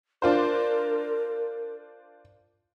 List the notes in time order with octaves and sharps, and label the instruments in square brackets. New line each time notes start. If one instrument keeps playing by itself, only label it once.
[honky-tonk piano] D4 F4 C5 [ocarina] A#4